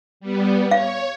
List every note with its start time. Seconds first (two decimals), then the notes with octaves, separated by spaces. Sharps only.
0.20 G3 B3
0.71 C#5 F5